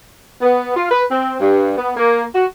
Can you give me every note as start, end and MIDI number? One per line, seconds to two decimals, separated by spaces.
0.42 0.75 59
0.76 0.88 65
0.91 1.03 71
1.11 1.35 60
1.40 1.73 43
1.78 1.93 59
1.97 2.24 58
2.35 2.46 66